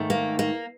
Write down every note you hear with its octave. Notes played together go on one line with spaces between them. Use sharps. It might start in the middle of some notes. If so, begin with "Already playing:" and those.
Already playing: G#2 D#3 A3
A#3
A#3